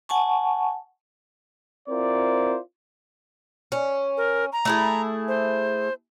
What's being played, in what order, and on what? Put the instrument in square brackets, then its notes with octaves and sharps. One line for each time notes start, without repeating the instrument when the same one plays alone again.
[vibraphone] F#5 G#5 A5 C#6
[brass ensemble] C4 E4 F4 A#4 C5 D5
[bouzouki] C#4
[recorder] A#4
A#5
[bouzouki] A3 E4 G#4
[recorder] C5